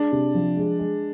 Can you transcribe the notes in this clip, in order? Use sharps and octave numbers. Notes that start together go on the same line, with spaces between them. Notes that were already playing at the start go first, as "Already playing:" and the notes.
Already playing: G#3 D4
C3
F3
G#3
G#3